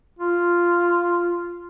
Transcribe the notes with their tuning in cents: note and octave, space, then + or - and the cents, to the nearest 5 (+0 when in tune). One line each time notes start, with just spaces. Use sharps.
F4 -5